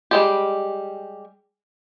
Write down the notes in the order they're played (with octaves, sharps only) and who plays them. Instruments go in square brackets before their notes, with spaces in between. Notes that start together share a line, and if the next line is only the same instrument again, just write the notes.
[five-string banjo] G3 G#3 G4